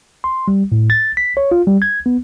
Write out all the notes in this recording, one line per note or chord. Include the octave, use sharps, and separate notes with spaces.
C6
G3
A2
A6
B6
C#5
F4
G3
G#6
B3